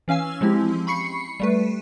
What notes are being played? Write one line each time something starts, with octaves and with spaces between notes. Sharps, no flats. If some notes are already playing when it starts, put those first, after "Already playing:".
E3 C#4 F5 G#5 E6
F3 G#3 C4 E4 G4
B5 C#6 C7 C#7
G3 A3 B4